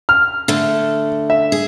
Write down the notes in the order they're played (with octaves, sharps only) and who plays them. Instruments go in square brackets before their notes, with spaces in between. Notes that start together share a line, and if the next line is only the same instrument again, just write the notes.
[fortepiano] F6
[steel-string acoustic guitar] D3 A3
[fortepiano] E5
[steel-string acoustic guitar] G#4